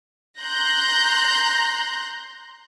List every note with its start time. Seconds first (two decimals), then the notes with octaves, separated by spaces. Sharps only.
0.40 A#5 C6 F#6 G6 A#6